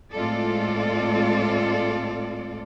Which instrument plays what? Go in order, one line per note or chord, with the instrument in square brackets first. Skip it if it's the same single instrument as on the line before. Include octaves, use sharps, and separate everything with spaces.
[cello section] A2 G#3 C4 F4 A4 D5